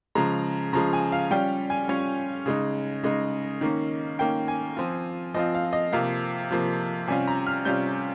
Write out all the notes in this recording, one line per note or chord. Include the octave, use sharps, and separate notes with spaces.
C#3 F3 G#3 A#5
C#3 F3 G#3 A#5
G#5
F5
G3 C#4 F4 G5
G#5
G3 C#4 F4 C#5
C#3 G#3 D#4
C#3 G#3 D#4 D#5
D#3 A#3 C#4
D#3 A#3 C#4 G5
G#5
F3 C4 F4
F3 C4 F4 D#5
F5
D#5
C3 F3 A#3 F5
C3 F3 A#3
C3 G3 C#4 F4 G#5
A#5
F6
C3 G3 C#4 F4 G6